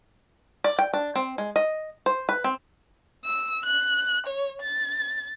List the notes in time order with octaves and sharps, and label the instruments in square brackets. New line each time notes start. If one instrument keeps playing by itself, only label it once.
[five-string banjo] D5
G5
D4
C4
G#3
D#5
C5
B4
C4
[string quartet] E6
F#6
C#5
A6